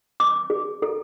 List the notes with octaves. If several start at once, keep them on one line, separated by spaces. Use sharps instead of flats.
D6
G#4
A4